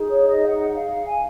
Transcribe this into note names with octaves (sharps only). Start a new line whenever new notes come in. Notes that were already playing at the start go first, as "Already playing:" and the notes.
Already playing: D#4 G#4
C#5
D#5
F#5
F5
G#5